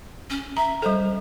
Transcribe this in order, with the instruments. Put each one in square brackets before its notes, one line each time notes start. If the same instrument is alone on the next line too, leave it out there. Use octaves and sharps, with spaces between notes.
[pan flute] C#4
[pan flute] E5 [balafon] A#5
[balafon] G3 A4 [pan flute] C5